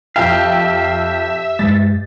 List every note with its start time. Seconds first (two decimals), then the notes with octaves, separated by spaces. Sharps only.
0.16 F2 G4 E5 F5 G5
1.59 G2 G#3 A6